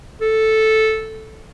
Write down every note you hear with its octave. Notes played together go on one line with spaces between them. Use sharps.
A4